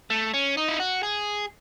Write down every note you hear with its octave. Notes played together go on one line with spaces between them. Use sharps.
A3
C#4
D#4
E4
F#4
G#4